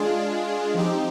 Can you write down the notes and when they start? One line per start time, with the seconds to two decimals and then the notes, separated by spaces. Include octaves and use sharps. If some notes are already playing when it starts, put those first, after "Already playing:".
Already playing: G#3 D4 F4 G#4
0.74 F3 C4 D#4 G4